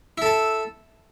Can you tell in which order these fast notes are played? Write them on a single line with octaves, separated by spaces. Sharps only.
E4 A4 A5